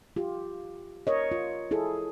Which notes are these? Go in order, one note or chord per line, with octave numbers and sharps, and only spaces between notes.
F4 G4
A#4 C#5 D#5
F4
E4 G#4 A4